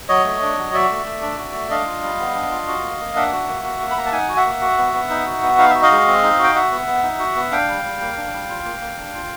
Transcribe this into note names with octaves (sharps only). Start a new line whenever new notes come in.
F#3 C#5 D#5
A3
D4
F#3
F#4 D5 E5
A3
A3
D4
F#4
A3
D4 D#5 F5
F4
G3
B3
D4
F4
F#4
A#3
A#3
D4 E5 F#5
F#4
A#3
F#4
A#3
B5
A#3 A#5
A5
D#4 F#5 G#5
F#4
E5 F#5
A#3
F#4
B3
B3
D#4
F#4
B3
D#4 F5
E5
F#4
D#5 F5
G#3
C4
D#4
F#4
G5
F#4 E5 F#5
B3
B3
D#4
F#4
B3
D4 F5 G5
G3
G3
A#3
D4
G3
F4
A#3
A#3
D4
F4